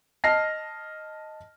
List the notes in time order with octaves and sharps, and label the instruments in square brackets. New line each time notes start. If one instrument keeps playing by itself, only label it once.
[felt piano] D#5 A5 F6 A#6 C7